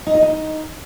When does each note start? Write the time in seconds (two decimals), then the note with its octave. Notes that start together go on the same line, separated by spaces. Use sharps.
0.07 D#4
0.15 D#5
0.22 D#4